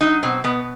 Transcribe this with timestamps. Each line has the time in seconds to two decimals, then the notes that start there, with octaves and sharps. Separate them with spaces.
0.01 F#3 D#4
0.23 B2 C4
0.44 B2 B3